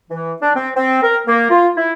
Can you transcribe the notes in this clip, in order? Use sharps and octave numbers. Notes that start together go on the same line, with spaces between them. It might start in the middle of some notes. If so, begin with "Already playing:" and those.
E3
D4
C4
C4
A#4
A#3
F4
E4